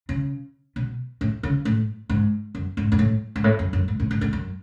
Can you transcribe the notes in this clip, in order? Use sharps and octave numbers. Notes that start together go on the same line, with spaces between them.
C#3
B2
A2
C#3
A2
G#2
F#2
G#2
G#2
A2
G#2
A2
F#2
F#2
G#2
A2
G#2
G#2
F#2